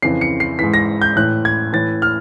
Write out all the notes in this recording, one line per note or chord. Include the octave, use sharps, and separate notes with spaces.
F2 C#3 E3 C7
C#7
C7
G#2 E3 B6
A#6
G6
A2 E3 F#6
G#6
A2 E3 A6
F6